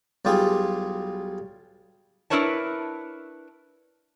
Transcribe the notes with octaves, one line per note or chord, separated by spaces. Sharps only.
B1 G3 F4 G4 G#4
D4 E4 A#4 B4 C#5 A5